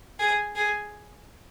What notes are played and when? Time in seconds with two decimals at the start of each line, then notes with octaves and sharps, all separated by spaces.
0.19 G#4
0.55 G#4